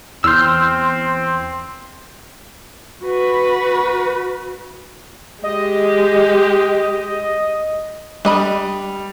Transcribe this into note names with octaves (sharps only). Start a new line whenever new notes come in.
E2 C4 C6 E6 F6 G6
F#4 B4
G#3 G4 D#5
G3 D4 D#5 B5